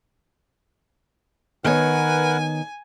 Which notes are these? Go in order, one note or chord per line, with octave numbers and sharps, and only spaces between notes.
D#3 B3 A#4 B4 C#5 F#5 G#5